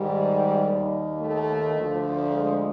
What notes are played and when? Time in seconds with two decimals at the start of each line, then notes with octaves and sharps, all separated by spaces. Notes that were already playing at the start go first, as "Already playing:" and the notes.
Already playing: G#2 D#3 G3
0.66 D#2 D#3
1.21 A3
1.76 D2 D3 F3
2.30 G#3